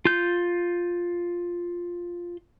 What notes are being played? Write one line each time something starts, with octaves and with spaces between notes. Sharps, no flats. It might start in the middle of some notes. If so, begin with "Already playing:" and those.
F4 G6